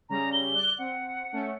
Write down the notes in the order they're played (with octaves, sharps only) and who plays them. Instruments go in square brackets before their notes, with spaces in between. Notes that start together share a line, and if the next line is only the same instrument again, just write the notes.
[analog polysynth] C#3 G3 [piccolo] A#5
[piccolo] G7
[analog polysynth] D5 F#6
[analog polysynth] C4 [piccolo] F#5
[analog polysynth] A3 C#4